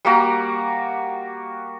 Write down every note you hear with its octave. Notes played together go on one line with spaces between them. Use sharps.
G3 A#3 F#4 A#5